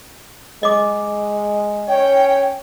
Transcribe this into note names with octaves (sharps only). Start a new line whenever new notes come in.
G#3 D#5 D6
C#4 C#5 G5